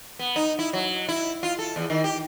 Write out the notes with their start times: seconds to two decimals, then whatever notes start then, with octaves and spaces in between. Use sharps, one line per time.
0.19 B3
0.36 D#4
0.59 E4
0.73 F#3
1.09 E4
1.43 F4
1.59 A4
1.76 E2
1.90 D#3
2.04 G4